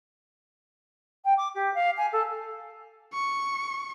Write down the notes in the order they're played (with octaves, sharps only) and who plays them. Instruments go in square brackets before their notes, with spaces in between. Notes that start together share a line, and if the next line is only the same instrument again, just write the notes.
[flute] G5
D6
G4
F5
G#5
A4
[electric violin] C#6